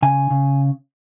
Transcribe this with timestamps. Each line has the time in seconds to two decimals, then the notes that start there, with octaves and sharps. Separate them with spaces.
0.03 C#3 G#5
0.30 C#3